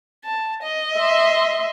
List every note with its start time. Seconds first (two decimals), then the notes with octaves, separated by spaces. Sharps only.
0.25 A5
0.62 D#5
0.97 E5 C6